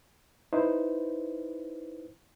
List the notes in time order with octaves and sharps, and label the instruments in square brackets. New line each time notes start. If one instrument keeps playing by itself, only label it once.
[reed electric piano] D#4 E4 B4 C5